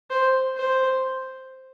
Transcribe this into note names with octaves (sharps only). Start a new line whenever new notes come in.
C5
C5